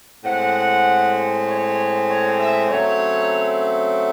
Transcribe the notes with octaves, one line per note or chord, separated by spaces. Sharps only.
A2 G#3 C4 F#5
C#5
C#5
E5
C#3 F#3 A3 C4 C#5